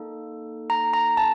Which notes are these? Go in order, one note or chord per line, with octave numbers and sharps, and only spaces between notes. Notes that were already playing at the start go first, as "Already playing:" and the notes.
Already playing: A#3 D#4 A4
A#5
A#5
A5